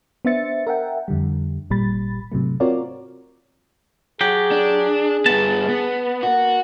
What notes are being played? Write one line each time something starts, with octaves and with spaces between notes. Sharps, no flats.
B3 D4 C5 E5 A6 C#7
A#4 E5 F#5 G5
F2 D3 G3
G#1 A#2 G3 B5 A6
G#2 C3 F#3 A3
C4 F4 F#4 A#4 C#5 D5
F#3 G4 G#4
D4
G2 B3 A5
B3
A#3 F#4